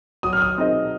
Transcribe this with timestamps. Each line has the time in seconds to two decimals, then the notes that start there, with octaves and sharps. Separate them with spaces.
0.23 F#3 D#6
0.33 F6
0.42 D#6
0.58 C4 D#4 G#4 D#5